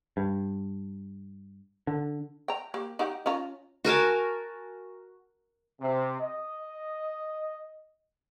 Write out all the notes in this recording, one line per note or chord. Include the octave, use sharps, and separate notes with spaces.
G2
D3
G5 A#5
A#3 G4
D#4 G4 F#5
C#4 F4 A#5
F#4 A#4 G#5 A5
C3
D#5